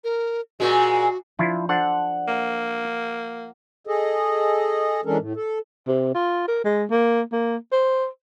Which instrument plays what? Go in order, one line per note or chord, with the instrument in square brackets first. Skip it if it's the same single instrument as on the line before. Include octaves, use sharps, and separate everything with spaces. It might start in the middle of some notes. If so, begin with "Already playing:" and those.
[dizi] A#4
[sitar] A#2 G#3 [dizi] F#4
[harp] F3 [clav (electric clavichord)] D4 E4 F4
[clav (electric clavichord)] D4 A4 C5 [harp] F#5
[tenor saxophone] A#3
[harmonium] G#4 A4 D#5
E3 G#3 C#4 D4 A4 A#4
A2
A4
[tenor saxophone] C3
F4
A#4
G#3
A#3
A#3
C5